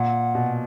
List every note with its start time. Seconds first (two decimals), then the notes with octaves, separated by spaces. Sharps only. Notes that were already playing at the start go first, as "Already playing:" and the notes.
Already playing: A#2 F#5
0.35 B2